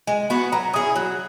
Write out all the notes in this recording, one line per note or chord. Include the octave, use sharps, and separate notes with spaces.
G#3 G#5
B3 F#4
F#3 A#5
C#4 E4 G#4 D#6
F#3 F#6